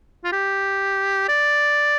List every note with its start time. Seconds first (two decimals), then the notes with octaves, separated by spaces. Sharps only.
0.24 F4
0.32 G4
1.29 D5